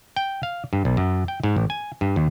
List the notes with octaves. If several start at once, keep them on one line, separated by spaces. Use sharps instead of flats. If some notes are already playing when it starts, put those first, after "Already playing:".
G5
F5
G2
B1
F#2
G5
G#2
A1
G#5
G2
D#2